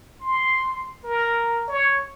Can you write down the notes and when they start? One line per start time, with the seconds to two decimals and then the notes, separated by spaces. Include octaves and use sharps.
0.21 C6
1.04 A#4
1.68 C#5